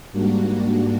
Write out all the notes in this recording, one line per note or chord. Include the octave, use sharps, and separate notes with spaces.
G#2 G3 A#3 D4 F#4